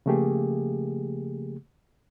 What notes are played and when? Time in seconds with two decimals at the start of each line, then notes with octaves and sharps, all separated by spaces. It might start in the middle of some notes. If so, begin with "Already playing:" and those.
0.06 C#3 F3 A3 A#3 G4 G#4